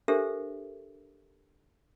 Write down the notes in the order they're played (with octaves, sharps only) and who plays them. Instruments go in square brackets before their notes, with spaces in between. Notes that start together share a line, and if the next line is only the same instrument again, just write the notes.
[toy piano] D4 G4 A4 A#4 C5 E5